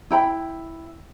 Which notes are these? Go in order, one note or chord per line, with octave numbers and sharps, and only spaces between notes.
E4 G5 A#5 B5